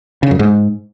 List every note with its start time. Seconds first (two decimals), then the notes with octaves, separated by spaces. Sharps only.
0.23 C#3
0.31 F#2
0.39 G#2